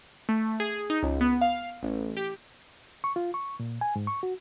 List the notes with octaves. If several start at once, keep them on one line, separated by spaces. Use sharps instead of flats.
A3
G#4
D#4
C#2
B3
F5
A1
G4
C#6
F4
C#6
A#2
G#5
G#2
C#6
F#4